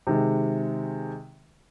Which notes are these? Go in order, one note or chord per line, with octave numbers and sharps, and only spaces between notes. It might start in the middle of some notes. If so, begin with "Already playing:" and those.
C3 D#3 G#3